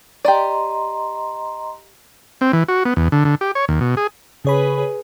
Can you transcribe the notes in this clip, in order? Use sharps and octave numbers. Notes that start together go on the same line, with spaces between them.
G4 D5 D#5 A#5 C6
C4
E3
F#4
B3
E2
D3
D3
G4
C#5
D#2
B2
G#4
C#3 G#4 B4 C#5 B5